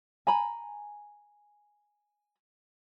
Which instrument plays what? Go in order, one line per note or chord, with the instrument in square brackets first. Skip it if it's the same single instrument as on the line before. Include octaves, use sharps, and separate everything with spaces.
[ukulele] G#5 A#5 B5